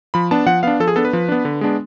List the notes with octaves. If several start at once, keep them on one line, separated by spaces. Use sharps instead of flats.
F3 B5
B3 D4 A5
F3 F#5
B3 D4 F5
F3 A4
G#4
B3 D4 A4
B4
F3
B3 D4
D3
G#3 B3 D4